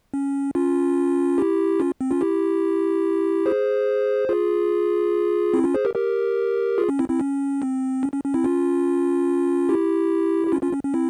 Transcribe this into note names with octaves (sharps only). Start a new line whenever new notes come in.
C#4
C#4 F4
E4 G4
C#4 F4
C4
C#4 F4
E4 G4
G#4 C5
F4 G#4
C4 E4
C#4 F4
G#4 C5
G4 A#4
G4 A#4
F4 G#4
C#4
C4 E4
C4 E4
C#4
C4
C#4
C#4
C#4
C4 E4
C#4 F4
E4 G4
G4
C#4 F4
C#4 F4
C#4
C#4
C4 E4